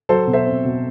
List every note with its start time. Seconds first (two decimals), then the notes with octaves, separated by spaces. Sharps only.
0.09 F#3 A4 C5
0.27 B2
0.33 C5 E5
0.46 C4
0.64 B2